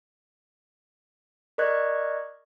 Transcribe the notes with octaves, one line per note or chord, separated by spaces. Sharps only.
A#4 D5 D#5 C#6 F#6 G#6